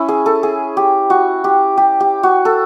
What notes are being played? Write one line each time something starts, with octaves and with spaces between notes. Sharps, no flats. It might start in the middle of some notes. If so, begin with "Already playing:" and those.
Already playing: C#4 E4
G#4
A4
G#4
G4
F#4
G4
G4
G4
F#4
A4